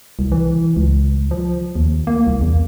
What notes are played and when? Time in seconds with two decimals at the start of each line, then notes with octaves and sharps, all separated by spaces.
0.19 C2
0.32 E3
0.77 C#2
1.31 F3
1.76 D#2
2.07 A#3
2.27 C2
2.41 E2